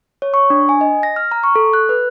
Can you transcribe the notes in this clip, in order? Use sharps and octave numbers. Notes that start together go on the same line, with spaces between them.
C#5
C#6
D4
G#5
D#5
A#6
F6
A#5
C#6
A4
F#6
B4